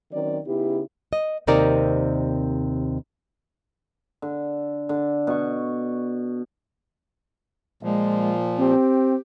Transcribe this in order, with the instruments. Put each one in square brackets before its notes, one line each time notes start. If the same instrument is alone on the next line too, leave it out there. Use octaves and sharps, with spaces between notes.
[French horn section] D#3 F#3 C4 C#4 D5
C#3 B3 D#4 E4 G4
[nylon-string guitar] D#5
D#2 C3 C4 D#4 A#4 D5
[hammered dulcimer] D3
D3
B2 C#6
[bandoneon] A#2 F3 [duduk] G#3
[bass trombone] C4 [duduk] G4